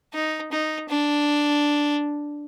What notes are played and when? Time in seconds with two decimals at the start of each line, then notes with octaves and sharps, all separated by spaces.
0.14 D#4
0.52 D#4
0.89 D4